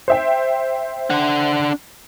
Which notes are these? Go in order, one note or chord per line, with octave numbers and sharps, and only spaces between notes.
C5 E5 G5
D4 F#5